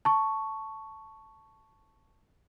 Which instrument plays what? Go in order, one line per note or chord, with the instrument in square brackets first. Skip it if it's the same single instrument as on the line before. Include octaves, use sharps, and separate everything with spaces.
[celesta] A5 C#6